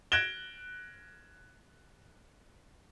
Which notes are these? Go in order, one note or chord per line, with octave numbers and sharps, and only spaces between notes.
F#6 G#6 A#6 D7 E7 G7